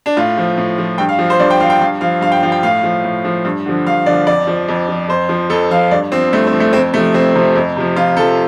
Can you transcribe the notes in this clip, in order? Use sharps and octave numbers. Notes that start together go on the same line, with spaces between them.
D4
A2 F4
F3
A2
F3
G2 G5
F5
F3
C5
G2 D5
G5
F3 F5
G5
G2 F5
F3 F5
G2 F5
G5
F3 F5
G5
A2 F5
F3
A2
F3
G2
D3 F3
G2 F5
D3 F3 D5
F2 D5
F3
F2
F3
F2 C5
F3
F2 A4
F3 F5
G2 D5
F3 C4
G2 A3
C4
F3
A3
F2 C4
C3 F3 A3
F2 C4
C3 F3
F2
C3 F3
F2 F4
C3 F3 A4